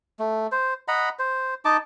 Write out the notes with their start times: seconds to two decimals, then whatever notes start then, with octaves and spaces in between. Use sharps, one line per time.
0.19 A3
0.52 C5
0.88 D#5 F#5 A#5 B5
1.19 C5
1.65 D#4 D#5 A5 D6